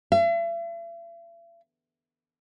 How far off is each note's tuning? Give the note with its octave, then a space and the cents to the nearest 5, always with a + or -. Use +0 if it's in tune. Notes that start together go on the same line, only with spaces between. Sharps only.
E5 +45